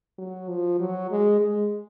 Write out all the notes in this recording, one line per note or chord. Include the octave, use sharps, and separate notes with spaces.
F#3
F3
F#3
G#3
G#3